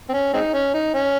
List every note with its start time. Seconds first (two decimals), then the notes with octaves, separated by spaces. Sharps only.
0.09 C4
0.13 C#4
0.34 G#3 C4 D#4
0.54 C#4
0.74 D#4
0.94 C#4